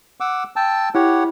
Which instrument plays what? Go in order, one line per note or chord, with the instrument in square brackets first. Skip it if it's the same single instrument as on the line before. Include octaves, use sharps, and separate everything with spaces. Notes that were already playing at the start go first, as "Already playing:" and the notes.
[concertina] F#5 D6 E6
G5 A5 E6
[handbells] E4 [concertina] G4 C#5 F#5